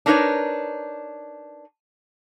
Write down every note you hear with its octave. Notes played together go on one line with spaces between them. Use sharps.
D4 D#4 A#4 B4 C#5